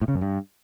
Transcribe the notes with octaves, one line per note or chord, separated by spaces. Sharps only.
A2
C#3
F#2
G2